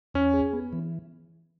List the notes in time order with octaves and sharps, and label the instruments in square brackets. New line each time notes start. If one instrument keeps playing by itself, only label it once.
[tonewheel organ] E2 [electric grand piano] C#4
[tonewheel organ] G#4
B3
E3